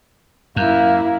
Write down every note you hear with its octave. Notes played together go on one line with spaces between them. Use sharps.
F#2 A#3 E4